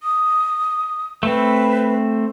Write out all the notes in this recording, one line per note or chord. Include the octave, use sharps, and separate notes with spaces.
D#6
A3 C4 B4